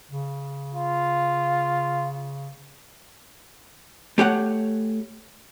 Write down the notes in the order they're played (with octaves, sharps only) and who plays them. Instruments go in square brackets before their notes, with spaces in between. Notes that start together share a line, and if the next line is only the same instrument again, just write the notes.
[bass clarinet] C#3
[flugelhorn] F4
[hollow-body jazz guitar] A3 G4 C#5 F#5